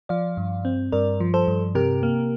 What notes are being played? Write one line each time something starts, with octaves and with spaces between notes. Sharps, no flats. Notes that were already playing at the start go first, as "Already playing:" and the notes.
F3 D5 F5
G2
C4
G2 A#4 D5
F3
A4 C5
G2
C3 G4 A#4
A#3